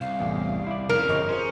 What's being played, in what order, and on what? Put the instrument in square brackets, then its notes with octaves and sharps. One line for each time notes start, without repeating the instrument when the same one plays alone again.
[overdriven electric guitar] C2 [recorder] F5
[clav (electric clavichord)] A1 E2
E4 D5
[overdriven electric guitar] F2 C#3 [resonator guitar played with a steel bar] A#4
[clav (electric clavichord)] G1 F3 C#5 [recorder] D#5
[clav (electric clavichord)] F3 C5 [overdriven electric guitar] C#4 [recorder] G#4